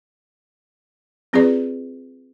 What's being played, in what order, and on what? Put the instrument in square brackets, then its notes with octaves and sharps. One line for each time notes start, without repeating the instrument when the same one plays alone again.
[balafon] F#3 C4 F4 G#4 B4 D5